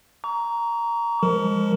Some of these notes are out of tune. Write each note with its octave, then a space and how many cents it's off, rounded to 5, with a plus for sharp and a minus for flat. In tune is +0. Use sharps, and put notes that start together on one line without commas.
A#5 +0 C#6 +40
F3 +0 G#3 -25 A#4 +0